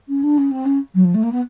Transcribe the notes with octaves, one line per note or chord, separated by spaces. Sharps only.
C#4
D4
C#4
C4
C#4
F#3
F3
A3
A#3
B3